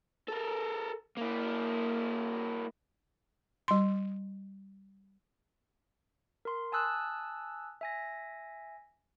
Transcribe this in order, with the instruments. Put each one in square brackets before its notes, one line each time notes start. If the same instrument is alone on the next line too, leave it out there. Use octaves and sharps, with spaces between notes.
[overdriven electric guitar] A4 A#4
A#3 E4
[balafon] G3 C6
[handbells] A#4 C6
G#5 A5 D#6 E6 F#6
E5 G#5 A#6